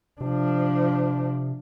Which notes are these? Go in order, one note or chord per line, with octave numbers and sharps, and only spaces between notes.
C3 F3 D4